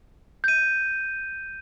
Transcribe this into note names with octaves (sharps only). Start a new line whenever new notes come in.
G6 D#7